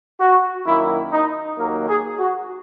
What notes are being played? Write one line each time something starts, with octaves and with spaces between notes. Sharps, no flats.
F#4
F#2 D#3 A#3 E4
D#4
D#2 D#3 F#3 A#3 A#4
G#4
F#4